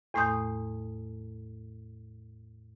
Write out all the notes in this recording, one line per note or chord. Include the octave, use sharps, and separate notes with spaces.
E2 A2 A3 C6 D#6 G6